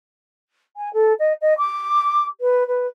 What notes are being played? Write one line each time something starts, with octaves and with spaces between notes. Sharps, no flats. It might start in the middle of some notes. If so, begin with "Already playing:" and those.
G#5
A4
D#5
D#5
D6
B4
B4